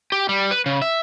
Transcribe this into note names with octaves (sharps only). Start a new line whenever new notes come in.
G4
G3
B4
C#3
E5